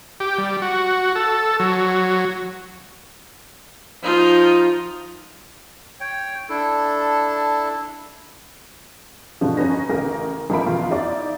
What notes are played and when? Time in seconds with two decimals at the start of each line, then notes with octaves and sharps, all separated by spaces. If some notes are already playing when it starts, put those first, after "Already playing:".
0.20 G4
0.38 G3
0.62 F#4
1.15 A4
1.60 F#3
4.03 F3 D#4 F4
6.00 C#5 G5
6.49 D4 E4 A4
9.41 E2 G2 B2 D3 F3
9.57 C#4 D#4 B4 A#6
9.90 A1 C#3 A#4 A#6
10.50 A1 F3 A#4 E5 B5 D7
10.66 E2 B2 F4
10.90 D#4 E4 D5